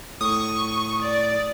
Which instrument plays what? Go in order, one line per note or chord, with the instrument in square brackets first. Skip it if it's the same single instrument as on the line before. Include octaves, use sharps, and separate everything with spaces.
[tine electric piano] A2 [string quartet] C#6 [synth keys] D#6
[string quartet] D5